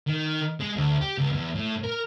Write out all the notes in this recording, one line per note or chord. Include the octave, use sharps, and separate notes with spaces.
D#3
G#3
D2
G4
C#2
E2
A2
A#4